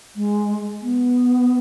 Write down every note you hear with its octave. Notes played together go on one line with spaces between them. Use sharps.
G#3
B3